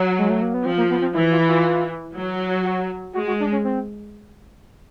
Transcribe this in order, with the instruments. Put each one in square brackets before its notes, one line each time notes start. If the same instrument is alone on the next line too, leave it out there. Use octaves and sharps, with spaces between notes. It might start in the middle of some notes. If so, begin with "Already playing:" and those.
Already playing: [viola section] F#3
[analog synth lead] G#3
A3
A#3
B3
[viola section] F3 [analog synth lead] C4
[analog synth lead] A#3
B3
C4
[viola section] E3 [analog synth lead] E4
[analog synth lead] F4
F4
[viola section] F#3
[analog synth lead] F#4
[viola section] G#3 [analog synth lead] F#4
[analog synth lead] F#4
D4
C#4
C4